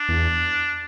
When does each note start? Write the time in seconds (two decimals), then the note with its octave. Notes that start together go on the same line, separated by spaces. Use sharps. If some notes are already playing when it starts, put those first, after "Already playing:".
Already playing: D4
0.09 E2